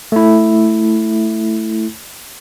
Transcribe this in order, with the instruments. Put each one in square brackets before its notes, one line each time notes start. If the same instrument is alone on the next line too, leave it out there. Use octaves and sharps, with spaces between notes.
[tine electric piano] A3 E4